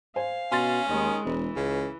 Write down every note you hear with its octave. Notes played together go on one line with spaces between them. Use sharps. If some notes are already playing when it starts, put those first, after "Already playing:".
C5 F5 G#5
B2 C#4 C6 A6
D#2 D#3 G#3
E1 E3
C#2 C#3